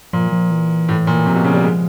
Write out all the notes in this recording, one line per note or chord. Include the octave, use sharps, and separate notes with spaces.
A#2 F3
F3
E3
A2
A#2
C3 F3
B2
C#3
G3
G#3